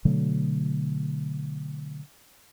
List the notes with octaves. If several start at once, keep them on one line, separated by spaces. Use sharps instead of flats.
B2 D3 F#3 A3